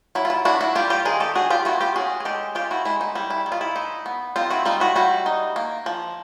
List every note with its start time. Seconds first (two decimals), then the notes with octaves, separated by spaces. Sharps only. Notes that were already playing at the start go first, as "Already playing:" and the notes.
0.15 F#3 E4
0.25 F4
0.30 E4
0.45 D4 E4 F#4
0.61 E4 F#4
0.75 G3 F4 G4
0.90 F4 G4
1.05 D#3 G#4 A#4
1.20 G4 A4
1.35 D4 F#4 G#4
1.50 F4 G4
1.65 B3 E4 F#4
1.81 F4 G4
1.96 C#4 F#4 G#4
2.20 G#4
2.25 G#3 G4 A4
2.55 C#4 F4 G4
2.71 E4 F#4
2.85 G#3 E4
3.01 D#4
3.15 G3 E4
3.30 E4
3.46 D#3
3.52 F4
3.61 E4
3.76 D#4
4.06 B3
4.36 C4 D#4 F4
4.50 E4 F#4
4.65 G3 D#4 F4
4.80 E4 F#4
4.96 G3 E4 F#4
5.26 D#4
5.56 A#3
5.86 F3